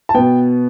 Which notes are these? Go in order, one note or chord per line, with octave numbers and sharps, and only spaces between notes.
A5
B2 B3 G5